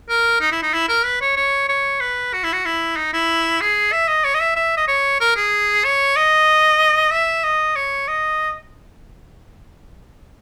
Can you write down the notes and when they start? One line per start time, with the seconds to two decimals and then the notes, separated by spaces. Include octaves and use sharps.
0.09 A#4
0.41 D#4
0.52 E4
0.63 D#4
0.74 E4
0.89 A#4
1.05 B4
1.22 C#5
1.37 C#5
1.69 C#5
2.01 B4
2.34 F#4
2.44 E4
2.53 F#4
2.66 E4
2.97 D#4
3.13 E4
3.61 G#4
3.92 E5
4.08 D#5
4.24 C#5
4.35 D#5
4.41 E5
4.56 E5
4.77 D#5
4.88 C#5
5.21 A#4
5.36 G#4
5.84 C#5
6.16 D#5
7.11 E5
7.44 D#5
7.76 C#5
8.08 D#5